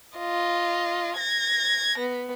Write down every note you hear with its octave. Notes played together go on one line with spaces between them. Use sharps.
F4 D#5
G#6 A#6
B3